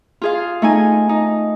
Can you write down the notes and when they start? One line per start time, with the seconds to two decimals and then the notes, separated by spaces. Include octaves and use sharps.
0.22 F4 G#4 F5
0.62 A3 D#4 G#5
1.09 D#4